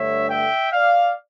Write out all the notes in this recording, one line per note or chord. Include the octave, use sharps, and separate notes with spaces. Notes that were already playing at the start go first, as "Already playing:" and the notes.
Already playing: G2 D3 A3 C#5 E5
E5 G5
D5 F5